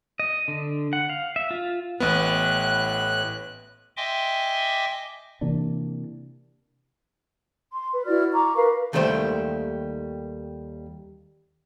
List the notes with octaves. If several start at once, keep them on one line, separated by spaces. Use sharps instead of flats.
D#5
D3
F#5
F5
E5
F4
A1 A2 B3 F#6
D#5 E5 G5 G#5 C6 D6
C3 E3 A#3 D4
C6
B4
E4 F#4 D5 F6
A#5 C#6 D6
A#4 B4 F5
D#2 D#3 G3 A3 C5 G5